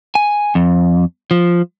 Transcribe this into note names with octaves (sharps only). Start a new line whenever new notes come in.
G#5
F2
F3